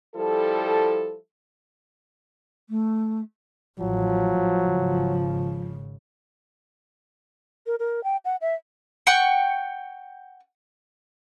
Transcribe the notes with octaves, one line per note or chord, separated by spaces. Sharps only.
F3 G3 E4 A4
A3
A1 F3 F#3
G#1 C#3
A#4
A#4
G5
F#5
E5
F#5 G5 C#6